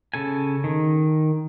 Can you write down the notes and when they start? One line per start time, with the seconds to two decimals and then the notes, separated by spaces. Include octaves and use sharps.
0.14 C#3 A4 G#5
0.64 D#3